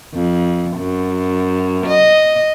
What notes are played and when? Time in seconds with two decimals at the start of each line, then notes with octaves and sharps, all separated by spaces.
0.14 F2
0.77 F#2
1.87 D#5